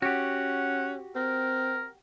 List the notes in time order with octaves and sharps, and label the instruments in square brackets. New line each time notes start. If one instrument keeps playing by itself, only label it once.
[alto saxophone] C#4 [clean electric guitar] F#4 G4 [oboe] F#5
[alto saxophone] C4 [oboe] A#4